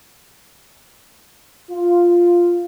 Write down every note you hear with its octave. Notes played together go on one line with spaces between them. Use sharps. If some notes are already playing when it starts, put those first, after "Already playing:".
F4